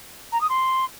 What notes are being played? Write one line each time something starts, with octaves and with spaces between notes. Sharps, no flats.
A#5
D#6
C6